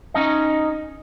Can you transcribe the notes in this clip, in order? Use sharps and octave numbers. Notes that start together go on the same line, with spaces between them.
C#4 D#4 D#5